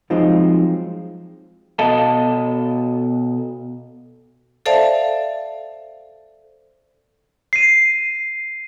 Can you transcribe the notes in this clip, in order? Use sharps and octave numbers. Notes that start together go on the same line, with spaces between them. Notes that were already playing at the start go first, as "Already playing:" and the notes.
F3 F#3 G#3 C4 D#4 F4
B2 A4 D#5 F5 A5
A4 C5 D5 E5 F5 A5
C7 D#7